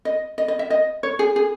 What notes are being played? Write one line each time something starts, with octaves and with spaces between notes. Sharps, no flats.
D#5
D#5
D#5
E5
D#5
C#5
G#4
G#4